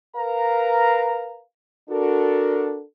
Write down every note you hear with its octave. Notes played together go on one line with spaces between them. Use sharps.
A#4 B4 F5 A#5
D4 F#4 A4 A#4